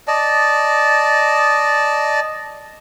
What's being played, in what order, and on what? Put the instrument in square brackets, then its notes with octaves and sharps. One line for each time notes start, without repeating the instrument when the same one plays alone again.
[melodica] D5 D#5 A5